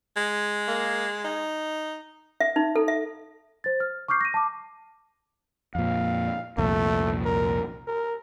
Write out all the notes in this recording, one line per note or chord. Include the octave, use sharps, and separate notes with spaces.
G#3
A#3
D#4
E5
D#4
A4
E5
C5 A6
F6
C#6 D6 F6 G6 C7
A#6 D#7
A5 D6
F2 A#2 F5
C2 F2 A#2 A3
A#4
A#4